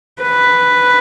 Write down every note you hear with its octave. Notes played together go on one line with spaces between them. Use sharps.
B4